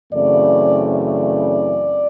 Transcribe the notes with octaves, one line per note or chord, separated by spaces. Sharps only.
F#2 C#3 E3 A3 C4 D5
D5